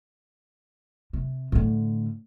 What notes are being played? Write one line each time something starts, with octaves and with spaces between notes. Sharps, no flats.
C3
A2 D3